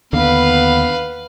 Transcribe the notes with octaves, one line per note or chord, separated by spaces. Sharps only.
D#2 D3 B3 B4 F5